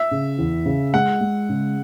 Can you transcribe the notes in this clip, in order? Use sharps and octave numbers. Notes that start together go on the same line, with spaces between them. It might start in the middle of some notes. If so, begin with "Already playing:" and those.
Already playing: E5
C#3
E2
C#3
G#3 F#5
G#3
C#3